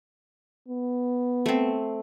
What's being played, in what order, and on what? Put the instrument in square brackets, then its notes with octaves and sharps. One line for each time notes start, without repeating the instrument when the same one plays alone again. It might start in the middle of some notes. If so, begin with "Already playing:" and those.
[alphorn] B3
[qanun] A3 C4